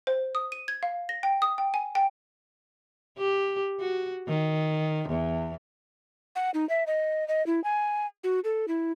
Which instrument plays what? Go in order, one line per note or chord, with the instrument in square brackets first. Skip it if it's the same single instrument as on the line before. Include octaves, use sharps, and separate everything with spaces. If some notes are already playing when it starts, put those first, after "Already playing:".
[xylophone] C5
D#6
D#7
G#6
F5
A#6
G5
D#6
G5
G#5
G5
[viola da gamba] G4
F#4
D#3
E2
[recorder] F#5
D#4
E5
D#5
D#5
E4
G#5
F#4
A4
E4